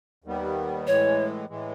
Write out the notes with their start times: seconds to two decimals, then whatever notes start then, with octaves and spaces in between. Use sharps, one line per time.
0.24 D#2 D#3 G3 B3
0.87 A2 E3 G#3 C#5
1.49 A2 E3 G#3